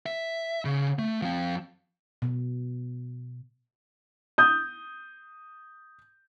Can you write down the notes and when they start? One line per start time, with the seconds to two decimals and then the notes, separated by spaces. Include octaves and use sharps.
0.06 E5
0.65 C#3
0.99 A3
1.22 F3 C4
2.22 B2
4.38 D#6 G6